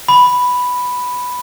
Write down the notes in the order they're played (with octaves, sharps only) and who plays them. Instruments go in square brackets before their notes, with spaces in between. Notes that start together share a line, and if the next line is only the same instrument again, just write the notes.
[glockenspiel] B5